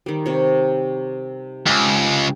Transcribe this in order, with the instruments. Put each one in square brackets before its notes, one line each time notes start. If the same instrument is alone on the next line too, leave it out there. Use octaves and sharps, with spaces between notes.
[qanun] D#3 G3
C3 C#5
[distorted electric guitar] C#2 [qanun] G5 A5